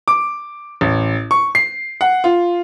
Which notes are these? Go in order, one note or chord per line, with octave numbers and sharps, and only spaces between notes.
D6
A1
C#6
C7
F#5
F4